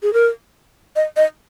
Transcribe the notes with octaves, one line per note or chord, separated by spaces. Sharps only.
G#4
A#4
D#5
D#5